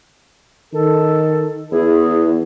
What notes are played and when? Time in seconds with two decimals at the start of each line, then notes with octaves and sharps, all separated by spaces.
0.74 D#3 A4
1.72 E2 E4 G#4